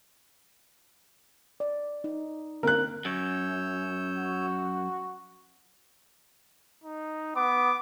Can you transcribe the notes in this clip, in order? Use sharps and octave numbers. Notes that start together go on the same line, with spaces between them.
D5
D#4
D3 A#3 C4 A#4 F#6
F#2 C#5 E6 G6
F#4
D#4
B3 D6